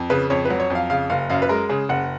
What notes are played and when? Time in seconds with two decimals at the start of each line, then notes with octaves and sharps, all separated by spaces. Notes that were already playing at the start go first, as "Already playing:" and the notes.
Already playing: F2
0.10 C#3 B4
0.30 F2 C#5
0.45 B4
0.50 F#3
0.60 C#5
0.70 F2 F5
0.90 C#3 F5
1.10 F#1 F5
1.29 F#2 F5
1.42 B4
1.49 G#3 A#4
1.69 C#3 G#4
1.89 F#1 F#5